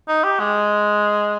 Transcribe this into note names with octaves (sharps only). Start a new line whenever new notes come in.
D#4
G4
G#3